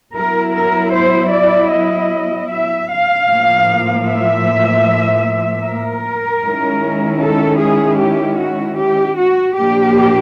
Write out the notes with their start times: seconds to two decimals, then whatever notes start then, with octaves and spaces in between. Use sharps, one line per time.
0.15 F#3 B3 E4 A#4
0.55 A#4
0.93 C5
1.32 D5
1.72 D#5
2.50 E5
2.90 F5
3.28 A2 F3 A#3
4.07 E5
5.64 A#4
6.43 D#3 G#3 C#4 E4
7.21 A4
7.60 G#4
7.99 G4
8.39 F#4
8.78 G4
9.17 F#4
9.56 A#2 F3 A#3 D4 G4